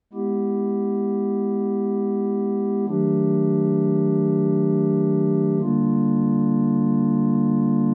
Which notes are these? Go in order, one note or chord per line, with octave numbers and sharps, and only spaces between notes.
G#3 B3 E4 G4
D#3 F#3 A3 D4 G4
D3 G3 A#3 D4 F4